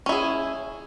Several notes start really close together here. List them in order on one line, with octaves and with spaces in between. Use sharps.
C#4 E4 G#4